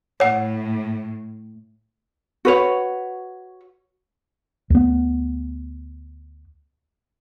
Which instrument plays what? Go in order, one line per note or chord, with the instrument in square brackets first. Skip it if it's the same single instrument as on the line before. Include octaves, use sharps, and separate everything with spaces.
[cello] A2 [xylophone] C#5 F#5
[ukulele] F#4 B4 C#5
[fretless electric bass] D2 B3